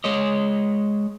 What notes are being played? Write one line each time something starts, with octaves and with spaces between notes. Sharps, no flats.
G#3 C#5 D#5